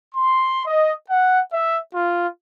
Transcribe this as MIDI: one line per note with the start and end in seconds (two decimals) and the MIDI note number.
0.15 0.64 84
0.66 0.92 75
1.10 1.39 78
1.52 1.78 76
1.94 2.27 65